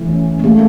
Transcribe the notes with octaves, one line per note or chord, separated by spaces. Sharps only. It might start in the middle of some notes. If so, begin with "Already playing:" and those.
Already playing: E3 A3
C#4
A3
G#3 A#3